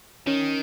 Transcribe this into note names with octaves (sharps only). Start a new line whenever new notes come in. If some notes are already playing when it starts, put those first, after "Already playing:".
D#3 C#4